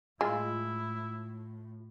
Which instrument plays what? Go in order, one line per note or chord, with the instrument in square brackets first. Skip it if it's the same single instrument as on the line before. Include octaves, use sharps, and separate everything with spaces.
[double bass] A2 [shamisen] G#3 [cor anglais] E4 [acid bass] F4